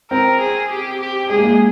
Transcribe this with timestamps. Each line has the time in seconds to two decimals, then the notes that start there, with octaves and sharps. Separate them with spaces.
0.11 C4 A#4
0.40 G#4
0.70 G4
1.00 G4
1.30 G#3 G#4
1.37 A#3
1.44 G#3